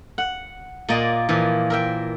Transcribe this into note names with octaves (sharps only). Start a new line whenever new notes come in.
F#5
A#2 A#3 D5 D#5
A#2 E3 F3
A#4 E5 G5